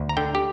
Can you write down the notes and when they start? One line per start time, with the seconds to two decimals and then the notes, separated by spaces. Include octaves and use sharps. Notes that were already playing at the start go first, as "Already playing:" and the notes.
Already playing: D2
0.09 A#5
0.17 D3 G5
0.35 G4